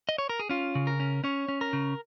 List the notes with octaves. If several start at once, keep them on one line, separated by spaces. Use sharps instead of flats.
D#5
C#5
A#4
G#4
C#4 F4
C#3
A#4
C#4
C#4 C#5
C#4
A#4
C#3